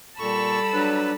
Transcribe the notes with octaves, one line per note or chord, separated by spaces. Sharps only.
A#2 G3 A4 A5 B5 C#6 E6
F#3 D4 B4